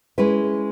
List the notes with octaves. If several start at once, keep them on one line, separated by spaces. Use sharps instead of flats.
G#3 C#4 E4 B4